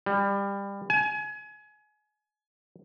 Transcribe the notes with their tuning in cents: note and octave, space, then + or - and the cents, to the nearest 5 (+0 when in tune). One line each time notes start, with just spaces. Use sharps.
G3 +25
G#5 +30